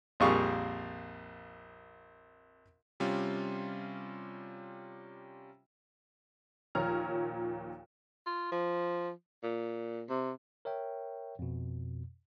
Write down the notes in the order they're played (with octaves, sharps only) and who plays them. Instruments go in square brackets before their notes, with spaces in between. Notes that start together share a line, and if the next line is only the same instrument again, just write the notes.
[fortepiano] A#1 F2 G3 G#4 F5 C#6
[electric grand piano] C3 G3 C#4 F4
[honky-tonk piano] D#2 A#2 F3 C#5 A#5 F6
[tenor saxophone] F4
F3
A#2
C3
[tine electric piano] A#4 C#5 E5 G5
F2 B2